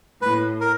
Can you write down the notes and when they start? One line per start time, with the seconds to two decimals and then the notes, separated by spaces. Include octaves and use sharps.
0.21 A2 B4
0.61 A#4